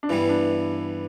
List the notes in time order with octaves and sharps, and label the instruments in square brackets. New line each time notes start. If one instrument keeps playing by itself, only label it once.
[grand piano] D4
[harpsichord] G2 E3 G3 B3 [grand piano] E4
[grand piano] D4